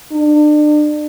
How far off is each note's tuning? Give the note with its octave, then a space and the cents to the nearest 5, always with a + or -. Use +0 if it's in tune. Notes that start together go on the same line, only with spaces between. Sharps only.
D4 +35